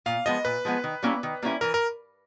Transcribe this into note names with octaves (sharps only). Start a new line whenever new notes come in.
A#2 F5
F3 G#3 B3 D#5
A#2 B4
F3 G#3 B3
D#3
G3 A#3 C#4 E4
D#3
G3 A#3 C#4 E4
E3 A#4
A#4